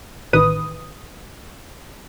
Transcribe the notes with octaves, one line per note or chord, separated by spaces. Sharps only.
A1 D#3 B4 D#6